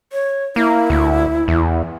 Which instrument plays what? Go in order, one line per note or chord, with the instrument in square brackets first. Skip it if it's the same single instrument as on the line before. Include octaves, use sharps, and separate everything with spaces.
[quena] C#5
[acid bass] A#3 [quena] E4
[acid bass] D2
E2